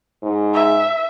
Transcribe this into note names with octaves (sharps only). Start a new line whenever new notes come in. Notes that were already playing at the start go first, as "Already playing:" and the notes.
G#2
E5